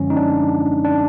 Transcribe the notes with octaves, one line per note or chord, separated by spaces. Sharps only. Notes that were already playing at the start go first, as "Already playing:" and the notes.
Already playing: F#2 D3 F3 G#3 C#4
D#4
D4
D4